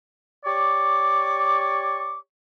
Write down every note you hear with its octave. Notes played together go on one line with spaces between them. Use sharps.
G4 C#5 D5 C#6 D6